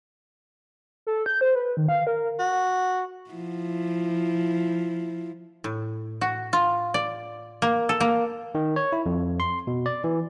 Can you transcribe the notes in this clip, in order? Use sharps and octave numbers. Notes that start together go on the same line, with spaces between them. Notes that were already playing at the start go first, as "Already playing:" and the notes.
A4
G6
C5
B4
D#3
F5
A#4
F#4
F3 E4
A2
F#4
F4
D5
A#3
A4
A#3
D#3
C#5
E4
F2
C6
B2
D5
E3